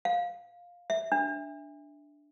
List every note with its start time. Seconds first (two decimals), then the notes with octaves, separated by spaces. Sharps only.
0.05 F5
0.90 E5
1.12 D4